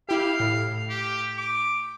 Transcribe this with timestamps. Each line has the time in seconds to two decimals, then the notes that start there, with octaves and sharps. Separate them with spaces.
0.09 E4 G4 F5
0.40 A2
0.90 G4
1.38 D6